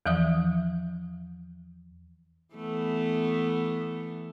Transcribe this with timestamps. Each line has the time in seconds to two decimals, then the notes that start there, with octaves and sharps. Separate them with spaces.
0.06 E2 E3 F3 E5 D#6
2.55 E3 A3 B3